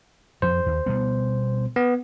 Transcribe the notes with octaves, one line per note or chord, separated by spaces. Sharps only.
F2 F3 C5
D#2
B2 G3 B3
B3